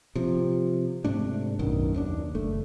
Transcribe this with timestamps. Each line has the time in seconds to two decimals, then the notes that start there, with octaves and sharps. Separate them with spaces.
0.15 C3 F3
1.04 G#2 C3 A3 D4
1.59 B1 F#2 D#3
1.94 D#2 B3 D4
2.35 F#1 A3